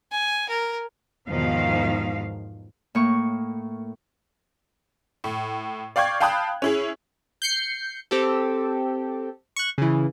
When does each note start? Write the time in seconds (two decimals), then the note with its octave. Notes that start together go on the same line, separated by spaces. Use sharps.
0.12 G#5
0.49 A#4
1.27 E2 G#2 B2 D#3 F3 F5
2.95 A2 A#3 C#6
5.24 A2
5.96 D5 F5 G5 C#6 G#6
6.20 F5 G5 A5 B5 D#6 F#6
6.62 C#4 E4 G#4
7.42 G6 C7 C#7
8.11 C4 G4 A4
9.56 C#6 F#6
9.78 C#3 E3